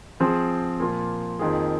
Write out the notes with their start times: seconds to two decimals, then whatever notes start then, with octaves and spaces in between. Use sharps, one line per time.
0.20 F3 C4 G#4
0.80 A#2 F3 A#3 F4
1.39 F2 D#3 A#3 F4 G#4